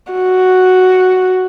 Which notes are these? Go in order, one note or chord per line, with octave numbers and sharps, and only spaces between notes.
F#4